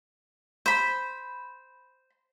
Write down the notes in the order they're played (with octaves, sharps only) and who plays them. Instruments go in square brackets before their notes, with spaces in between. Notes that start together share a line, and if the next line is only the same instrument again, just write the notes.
[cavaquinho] C5 B5